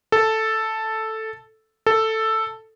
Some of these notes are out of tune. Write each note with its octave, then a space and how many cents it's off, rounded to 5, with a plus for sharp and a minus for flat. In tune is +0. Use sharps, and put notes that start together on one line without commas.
A4 +0
A4 +5